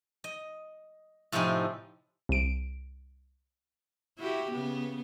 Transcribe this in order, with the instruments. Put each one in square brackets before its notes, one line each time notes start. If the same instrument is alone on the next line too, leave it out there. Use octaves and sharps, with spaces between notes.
[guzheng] D#5
A2 C3 F3 C4 D#4 G#5
[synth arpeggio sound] C2 D7
[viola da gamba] E4 F#4 G4
C#3 B3